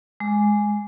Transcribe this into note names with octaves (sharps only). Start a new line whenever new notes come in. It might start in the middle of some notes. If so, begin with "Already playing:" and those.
G#3